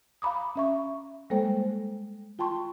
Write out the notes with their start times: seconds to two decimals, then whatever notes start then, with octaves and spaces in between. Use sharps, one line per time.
0.22 F5 A#5 B5 D6 D#6
0.56 C#4 E5 C#6
1.30 G3 G#3 A#3 A4 C5 G5
2.39 F4 G5 A5 C6 C#6